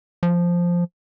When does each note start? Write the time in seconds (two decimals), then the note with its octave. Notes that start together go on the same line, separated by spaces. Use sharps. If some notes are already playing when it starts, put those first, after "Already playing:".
0.23 F3